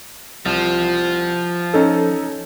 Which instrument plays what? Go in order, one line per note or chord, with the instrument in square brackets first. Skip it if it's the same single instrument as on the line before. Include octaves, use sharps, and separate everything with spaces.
[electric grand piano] C2 [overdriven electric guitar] F3
[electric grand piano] C#4 D#4 A4